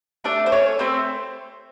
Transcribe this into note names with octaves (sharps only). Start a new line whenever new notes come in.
A3 D4 D5
C5
A3 C#4 C#5
A3 C4 C5